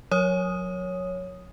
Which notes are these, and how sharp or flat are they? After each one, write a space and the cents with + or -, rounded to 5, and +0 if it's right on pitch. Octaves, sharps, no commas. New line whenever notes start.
F#3 -35 C#5 +0 D#6 +0